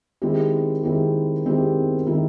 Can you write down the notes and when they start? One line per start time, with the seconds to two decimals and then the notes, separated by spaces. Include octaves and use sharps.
0.22 D#3 G#3 C4 E4 G4
0.83 D#3 G#3 C4 E4 G4
1.45 D#3 G#3 C4 E4 G4
2.06 D#3 G#3 C4 E4 G4